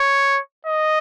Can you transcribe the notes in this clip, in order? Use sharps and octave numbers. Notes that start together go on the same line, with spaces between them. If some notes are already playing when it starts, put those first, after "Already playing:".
Already playing: C#5
D#5